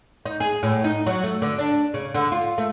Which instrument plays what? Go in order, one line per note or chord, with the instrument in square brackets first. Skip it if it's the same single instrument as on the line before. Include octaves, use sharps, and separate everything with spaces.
[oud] D#4
G#4
A2
D#4
F#3
A3
D3
D4
C#3
D3
F4
A3